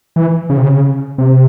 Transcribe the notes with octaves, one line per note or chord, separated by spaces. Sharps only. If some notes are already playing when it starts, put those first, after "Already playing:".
E3
C#3
C3
C#3
C3